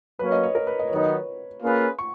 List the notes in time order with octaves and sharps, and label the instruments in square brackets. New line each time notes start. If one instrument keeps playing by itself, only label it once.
[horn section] F#3 A#3 C#4 [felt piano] B4
[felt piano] D#5
C#5
A#4
B4
D#5
C#5
[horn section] D#3 F#3 B3 D#4 [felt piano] B4
[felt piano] C#5
[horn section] A#3 C#4 F4 G#4 B4
[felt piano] C#6